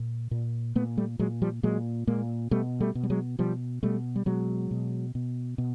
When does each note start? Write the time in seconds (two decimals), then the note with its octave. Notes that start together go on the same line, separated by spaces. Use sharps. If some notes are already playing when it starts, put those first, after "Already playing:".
Already playing: A#2
0.31 A#2
0.75 A#2 A3 B3
0.97 G3 A3
1.19 A#2 F#3 G#3
1.42 F3 G3
1.63 A#2 F#3 G#3
2.07 A#2 G#3 A#3
2.51 B2 G3 A3
2.80 G3 A3
2.95 B2
3.03 G3
3.10 F#3 G#3
3.39 B2 F3 G3
3.83 B2 G3 A3
4.16 G3
4.26 B2 F#3 G#3
4.71 B2
5.15 B2
5.58 B2